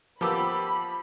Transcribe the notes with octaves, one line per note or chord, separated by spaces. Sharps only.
F3 A#3 B3 G4 B5 D6 E6